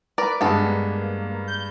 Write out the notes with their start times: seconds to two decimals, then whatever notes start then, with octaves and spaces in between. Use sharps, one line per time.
0.18 A#4 B4 D5
0.41 G2 G#3 B3 D4 A4
0.66 A#3
1.48 G6